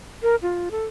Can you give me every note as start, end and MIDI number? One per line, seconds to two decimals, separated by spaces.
0.22 0.36 70
0.42 0.69 65
0.71 0.86 69